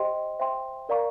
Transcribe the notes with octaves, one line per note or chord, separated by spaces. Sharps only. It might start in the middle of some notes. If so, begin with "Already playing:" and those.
Already playing: G4 C5 D#5 G5 C6
C5 E5 G5 C6
A#4 D5 F5 A#5 C#6